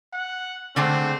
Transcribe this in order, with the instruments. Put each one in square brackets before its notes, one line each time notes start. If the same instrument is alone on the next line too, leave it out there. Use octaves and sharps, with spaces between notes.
[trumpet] F#5
[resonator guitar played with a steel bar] D3 G#3 A3 [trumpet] C4